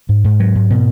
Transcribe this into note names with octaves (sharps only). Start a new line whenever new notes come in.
G#2
G#2
F#3
G#2
B2